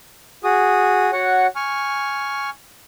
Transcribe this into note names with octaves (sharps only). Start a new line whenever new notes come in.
F#4 G#4 D#6
F#4 C#5 F#5
G#5 C#6 F6